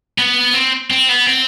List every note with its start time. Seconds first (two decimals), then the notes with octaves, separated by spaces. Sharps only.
0.18 B3
0.54 C4
0.90 C4
1.09 B3
1.26 C4